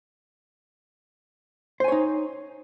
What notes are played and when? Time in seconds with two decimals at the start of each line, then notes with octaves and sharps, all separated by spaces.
1.80 C5
1.84 G#5
1.88 C#5
1.92 D#4